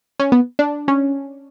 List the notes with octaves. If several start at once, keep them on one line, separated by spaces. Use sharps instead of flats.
C#4
B3
D4
C#4